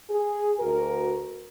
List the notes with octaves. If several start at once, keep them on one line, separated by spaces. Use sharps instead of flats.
G#4
D2 F#4 A#4